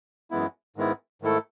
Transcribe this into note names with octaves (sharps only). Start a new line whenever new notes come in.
F#2 E3 G#3 B3 E4
G#2 D#3 G#3 B3 E4
G#2 D#3 A3 E4 A4